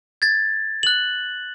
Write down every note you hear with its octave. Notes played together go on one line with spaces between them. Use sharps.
G#6 A6
F#6 F#7